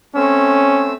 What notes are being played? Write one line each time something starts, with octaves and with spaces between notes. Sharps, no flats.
A3 C4 C#4 E6